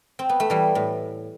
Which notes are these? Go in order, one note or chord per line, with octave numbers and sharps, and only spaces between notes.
C4
B3
A3
E3 G3
A2